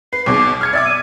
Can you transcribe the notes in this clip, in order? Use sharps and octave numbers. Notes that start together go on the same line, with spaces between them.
B4 C7
B1 B2 G#4 D6
F6 G#6 C#7
D5 E5 D6 A6
D#7